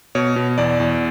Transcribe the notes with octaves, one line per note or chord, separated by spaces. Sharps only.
B2 C#5
B2
E2 D5
E2